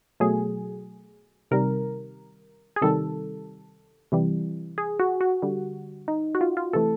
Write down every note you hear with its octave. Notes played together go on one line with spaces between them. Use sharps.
B2 F#3 A3 G#4
C3 D#3 G3 A#4
G#4
C3 D#3 G3 A4
C3 E3 G3
G#4
F#4
F#4
D3 G3
D#4
F#4
F4
F4
C3 E3 A3 A4